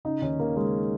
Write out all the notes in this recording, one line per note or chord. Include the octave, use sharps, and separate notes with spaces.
C#3 D#4
D#2 C#4
D#2 A#3
C#3 G#3